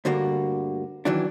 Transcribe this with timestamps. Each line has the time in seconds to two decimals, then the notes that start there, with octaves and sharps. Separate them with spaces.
0.05 D2 G2 D3 G3 A#3 F#4
1.05 D#3 E3 F#3 D4